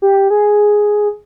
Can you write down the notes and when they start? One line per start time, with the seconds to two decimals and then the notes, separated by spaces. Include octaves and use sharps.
0.02 G4
0.30 G#4